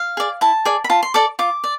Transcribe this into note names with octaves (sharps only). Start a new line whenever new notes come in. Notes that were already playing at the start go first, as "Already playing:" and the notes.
Already playing: F5
G#4 D5
E4 A5
G#4 D5
B5
F4 A5
C6
A4 D5 D6
F4 D6
D5